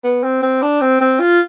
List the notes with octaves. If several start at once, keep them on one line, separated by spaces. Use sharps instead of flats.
B3
C4
C4
D4
C4
C4
F4